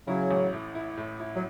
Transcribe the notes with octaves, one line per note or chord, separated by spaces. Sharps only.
C#3 F#3 E4
A1
A2
E4
A2
E4
F#3